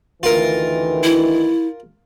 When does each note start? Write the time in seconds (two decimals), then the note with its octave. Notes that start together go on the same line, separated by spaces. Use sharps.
0.23 D2 D#3 E3 F4 A#4
1.03 E4